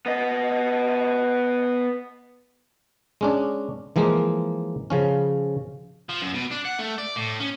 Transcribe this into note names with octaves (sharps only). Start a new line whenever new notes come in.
B3 D#5
G#3 C#4 D4
E3 F3 G#3 A#3
C#3 F3 C#4
F3
F#2
B2
D4
F#5
A3
D5
A2
C#4